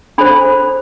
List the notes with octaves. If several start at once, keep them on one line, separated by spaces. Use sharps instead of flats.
D4 A4 C5 B5